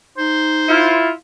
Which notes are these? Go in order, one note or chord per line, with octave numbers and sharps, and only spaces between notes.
D#4 C5
E4 F4